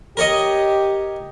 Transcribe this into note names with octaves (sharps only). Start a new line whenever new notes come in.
G4 A#4 C#5 D#5